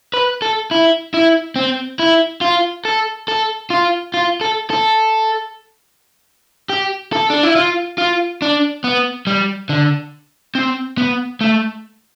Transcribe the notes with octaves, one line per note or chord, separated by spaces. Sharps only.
B4
A4
E4
E4
C4
E4
F4
A4
A4
F4
F4
A4
A4
G4
A4
D4
E4
F4
F4
D4
B3
G3
D3
C4
B3
A3